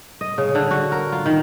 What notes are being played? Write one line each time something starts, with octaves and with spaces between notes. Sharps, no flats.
D#5
C#3
D3
F#4
A#4
F4
D#3